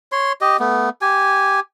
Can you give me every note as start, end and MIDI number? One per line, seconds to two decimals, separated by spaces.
0.12 0.32 73
0.12 0.32 84
0.41 0.57 67
0.41 0.57 75
0.60 0.89 57
0.60 0.89 59
1.02 1.60 67
1.02 1.60 80